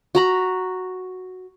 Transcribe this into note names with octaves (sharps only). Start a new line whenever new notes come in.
F#4 A#5 B5